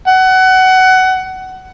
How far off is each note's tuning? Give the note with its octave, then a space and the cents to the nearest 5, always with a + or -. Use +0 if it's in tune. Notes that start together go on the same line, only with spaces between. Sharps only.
F#5 +20